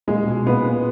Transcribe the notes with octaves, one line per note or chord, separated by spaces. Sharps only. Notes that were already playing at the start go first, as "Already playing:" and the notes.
A#2 G#3
B2
A#2 B3
A#2